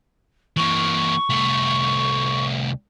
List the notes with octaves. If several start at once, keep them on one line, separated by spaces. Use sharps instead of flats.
E3 A#3 C#6
C2 A3